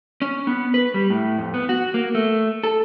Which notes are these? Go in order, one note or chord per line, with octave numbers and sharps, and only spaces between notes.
C#4
B3
B4
G3
A2
F2
B3
F#4
A#3
A3
A4